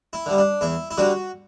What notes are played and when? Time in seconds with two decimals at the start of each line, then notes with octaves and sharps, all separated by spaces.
0.13 E4
0.26 D3 G3
0.38 D4
0.61 E2 E4
0.91 E4
0.98 D3 G3 F#4